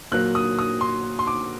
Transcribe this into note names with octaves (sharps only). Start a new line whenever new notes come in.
A#2 F#3 A#3 F#6
D#6
D#6
C6
C6
D6